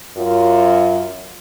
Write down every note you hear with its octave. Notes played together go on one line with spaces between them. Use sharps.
F#2 F4